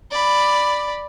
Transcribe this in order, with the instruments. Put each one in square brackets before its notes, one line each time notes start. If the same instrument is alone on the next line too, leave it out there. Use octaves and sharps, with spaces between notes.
[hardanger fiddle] D5 B5